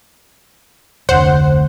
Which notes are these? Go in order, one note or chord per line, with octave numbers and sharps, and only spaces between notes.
F1 D2 D3 C5 F#5